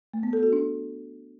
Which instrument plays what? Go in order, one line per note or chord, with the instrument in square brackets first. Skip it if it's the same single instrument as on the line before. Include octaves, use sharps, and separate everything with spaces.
[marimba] A3
B3
A4
F#4
D4